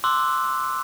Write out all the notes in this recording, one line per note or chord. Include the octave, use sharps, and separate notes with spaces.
C6 D6 E6 F#6